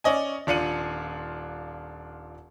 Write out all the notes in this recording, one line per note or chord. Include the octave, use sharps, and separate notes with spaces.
C#4 D5 D#5 G#5
D#1 D4 F4 C#7 D#7 F#7